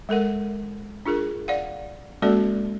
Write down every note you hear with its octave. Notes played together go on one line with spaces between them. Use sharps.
G#3 A4 A#4 F#5
D4 F4 G#4 A#4
D5 F5 F#5
G#3 A#3 C#4 F#4 A4 D5